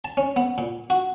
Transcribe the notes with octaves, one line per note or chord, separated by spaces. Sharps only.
A5
C#4
B3
A#2
F#4